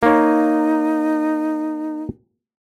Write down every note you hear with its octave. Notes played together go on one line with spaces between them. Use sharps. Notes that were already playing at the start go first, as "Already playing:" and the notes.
A#3 D#4 C#5